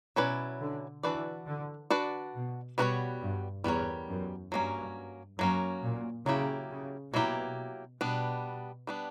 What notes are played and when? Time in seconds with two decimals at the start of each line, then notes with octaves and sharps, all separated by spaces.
0.16 B2 F#3 C#4 E4 B4 D5
0.60 D3
1.03 E3 D4 F#4 B4 D5
1.47 D3
1.90 D4 F#4 B4 D5
2.34 B2
2.78 B2 G3 B3 F#4 A#4 C#5
3.21 G2
3.64 E2 G3 B3 F#4 A#4 C#5
4.09 F#2
4.52 G2 F#3 A#3 C#4
5.39 F#2 F#3 A#3 C#4
5.83 A#2
6.26 C#3 F#3 A#3 E4 G4
6.70 C#3
7.13 B2 F#3 A#3 E4 G4
8.00 B2 G3 B3 D4
8.87 G3 B3 D4